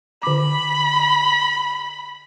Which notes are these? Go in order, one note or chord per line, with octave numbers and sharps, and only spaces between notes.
D3 B5 D6